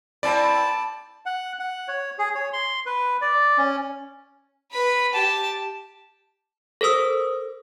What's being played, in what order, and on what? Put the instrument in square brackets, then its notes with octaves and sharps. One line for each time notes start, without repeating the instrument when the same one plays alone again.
[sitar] C4 E4 B4 [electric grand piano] D5 [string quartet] A5
[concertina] F#5
F#5
C#5
G#4
C#5
C6
B4
D5
C#4
[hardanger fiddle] B4 B5
G4 A5
[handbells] A4 A#4 C5 D#6 E6